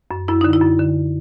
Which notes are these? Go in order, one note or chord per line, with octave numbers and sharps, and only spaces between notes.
F#2
F#2 E4
D3 D#4
E4
F#2
D3